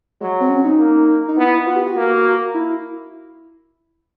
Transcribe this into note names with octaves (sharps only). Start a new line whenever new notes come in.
F#3 G#3
C4
C#4
D#4
A#3
D#4
B3 E4
B3 F4
G4
F#4
A#3
E4